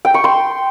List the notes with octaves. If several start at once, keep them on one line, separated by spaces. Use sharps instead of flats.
G5
C#6
C6